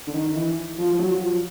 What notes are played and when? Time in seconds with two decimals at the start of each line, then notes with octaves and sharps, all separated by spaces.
0.07 D3
0.14 D#3
0.35 E3
0.78 F3
0.91 F3
0.98 F#3
1.20 F3